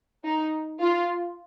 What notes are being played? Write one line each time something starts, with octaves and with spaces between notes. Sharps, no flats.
D#4
F4